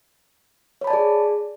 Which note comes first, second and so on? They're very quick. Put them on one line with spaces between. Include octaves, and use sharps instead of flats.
C#5 B5 A5 D5 G#4